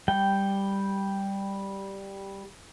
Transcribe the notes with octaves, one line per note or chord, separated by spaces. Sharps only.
G3 G5